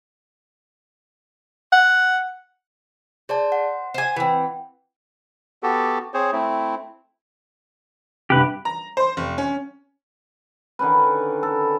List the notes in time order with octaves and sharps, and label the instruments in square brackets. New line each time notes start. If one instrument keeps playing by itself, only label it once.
[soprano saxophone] F#5
[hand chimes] G#4 D5 A5 [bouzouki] C5
[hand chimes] F#5
[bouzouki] C5 G#5
E3 C4
[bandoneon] B3 F#4 G4 A4
C4 G#4 C5 C#5
A3 C4 E4
[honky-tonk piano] C2 G2 [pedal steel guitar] G4 B4
[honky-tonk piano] A#5
C5
F1
C#4
[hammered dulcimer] D3 D#3 C#4 B4
A4